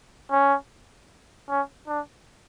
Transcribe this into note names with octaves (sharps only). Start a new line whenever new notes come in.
C#4
C#4
D4